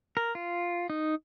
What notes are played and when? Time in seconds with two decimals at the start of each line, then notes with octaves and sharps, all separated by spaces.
0.17 A#4
0.35 F4
0.90 D#4